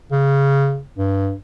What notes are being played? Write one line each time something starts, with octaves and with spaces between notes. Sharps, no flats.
C#3
G2